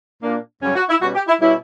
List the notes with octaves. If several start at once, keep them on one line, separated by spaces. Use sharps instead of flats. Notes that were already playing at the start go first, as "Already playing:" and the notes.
A#2 A#3 D4
F#2 C#3 G3 C#4
F#4
E4
B2 G3 C#4 F#4
G4
E4
B2 G3 C#4 E4